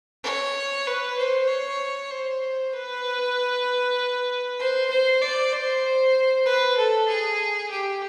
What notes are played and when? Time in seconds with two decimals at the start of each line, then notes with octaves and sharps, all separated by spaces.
0.24 C#5
0.87 B4
1.18 C5
1.48 C#5
2.11 C5
2.73 B4
4.60 C5
4.91 C5
5.22 D5
5.53 C5
6.46 B4
6.77 A4
7.08 G#4
7.71 G4